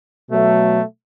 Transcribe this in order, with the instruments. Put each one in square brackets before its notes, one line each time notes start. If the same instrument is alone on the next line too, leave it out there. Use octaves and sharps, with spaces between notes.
[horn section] B2 F#3 A3